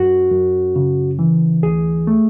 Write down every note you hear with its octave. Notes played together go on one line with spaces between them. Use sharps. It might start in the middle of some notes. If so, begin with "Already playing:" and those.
Already playing: F#2 F#4
F#2
C#3
E3
D2 G#4
A3